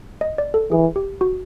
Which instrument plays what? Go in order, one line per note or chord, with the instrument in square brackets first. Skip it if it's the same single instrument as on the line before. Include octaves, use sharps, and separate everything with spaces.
[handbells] D#5
D5
A4
[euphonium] E3 [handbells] G#4
[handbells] G4
F#4